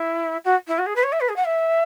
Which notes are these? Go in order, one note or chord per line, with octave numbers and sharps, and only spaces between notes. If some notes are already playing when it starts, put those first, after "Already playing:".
Already playing: E4
F#4
E4
F#4
G#4
B4
C#5
E5
B4
G#4
F#5
E5